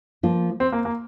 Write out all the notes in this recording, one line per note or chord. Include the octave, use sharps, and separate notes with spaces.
F3 A#3 F4
C4
A#3
A#3